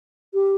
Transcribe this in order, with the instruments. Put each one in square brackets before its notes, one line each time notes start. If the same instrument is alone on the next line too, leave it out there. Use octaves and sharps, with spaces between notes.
[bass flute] G4